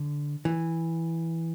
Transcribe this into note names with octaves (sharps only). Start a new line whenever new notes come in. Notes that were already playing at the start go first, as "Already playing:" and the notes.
Already playing: D3
E3